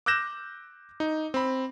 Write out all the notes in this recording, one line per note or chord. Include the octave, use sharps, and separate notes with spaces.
D6 E6 F#6 G6 A#6 E7
D#4
C4 B5